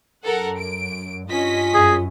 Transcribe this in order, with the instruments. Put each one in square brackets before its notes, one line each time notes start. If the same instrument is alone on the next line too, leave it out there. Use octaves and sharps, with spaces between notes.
[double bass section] F#2 [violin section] A4 A#4 F#5
[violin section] D7
[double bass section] G2 [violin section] C#4 D#5 B6 [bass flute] F4
[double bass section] F#2 [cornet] G#4